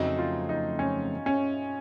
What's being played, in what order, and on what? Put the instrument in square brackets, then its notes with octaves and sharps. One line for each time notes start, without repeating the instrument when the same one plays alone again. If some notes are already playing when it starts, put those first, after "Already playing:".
Already playing: [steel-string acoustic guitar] F2 C#3 F#3 A3 C4 [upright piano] D#4
[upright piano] F4
D#4
C#4
C#4